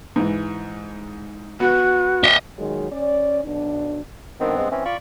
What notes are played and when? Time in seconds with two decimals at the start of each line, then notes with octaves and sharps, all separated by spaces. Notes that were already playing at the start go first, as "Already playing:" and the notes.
0.16 G#2 E3
1.60 B3 F#4
2.24 D#5 E5
2.58 A#2 D#3 F#3 G#3
2.91 C#4 D5
3.43 B1 B2 D4
4.40 G2 D#3 B3 C4
4.58 G#3
4.71 E3 C4 C#4
4.85 F4 D5 B5 C#6